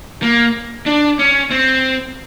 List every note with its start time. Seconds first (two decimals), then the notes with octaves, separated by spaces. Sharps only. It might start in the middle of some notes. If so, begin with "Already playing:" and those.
0.22 A#3
0.86 D4
1.19 C#4
1.51 C4